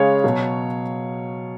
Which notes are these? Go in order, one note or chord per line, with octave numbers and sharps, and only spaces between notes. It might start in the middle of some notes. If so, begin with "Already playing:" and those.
Already playing: C#3 G#3 C#5 F5
B2 F#3